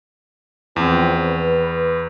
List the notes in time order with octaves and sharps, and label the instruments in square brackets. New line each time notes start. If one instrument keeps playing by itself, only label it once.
[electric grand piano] E2 [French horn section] F3 C4
[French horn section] B4